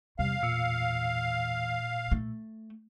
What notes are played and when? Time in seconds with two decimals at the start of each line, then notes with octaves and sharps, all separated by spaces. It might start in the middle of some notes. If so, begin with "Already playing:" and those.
0.19 E2 C3 G3 F5
0.43 A#2 E6 C#7
2.12 A3